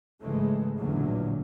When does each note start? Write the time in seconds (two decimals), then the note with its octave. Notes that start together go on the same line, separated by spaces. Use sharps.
0.20 G#1 C#3 E3 G#3 A3
0.77 A1 E2 A#2 D3 E3 F#3